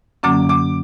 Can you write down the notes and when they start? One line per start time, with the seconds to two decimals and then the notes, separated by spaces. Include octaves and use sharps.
0.23 F#2 D3 F#3 A#3 C#4 D6
0.49 D6